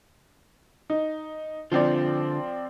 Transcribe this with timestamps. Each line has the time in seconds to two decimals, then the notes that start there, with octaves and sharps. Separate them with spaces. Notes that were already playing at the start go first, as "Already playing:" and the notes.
0.90 D#4
1.72 D3 F3 C4 F4 C5 D5